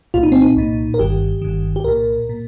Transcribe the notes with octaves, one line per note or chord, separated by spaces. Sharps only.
C2 A#2 F4
D#4
C4
D#4
C2 A#2
A#4
G1 G2 D#3 G4
G1 G2 D#3
G4
C2 A#2 A#4
A#2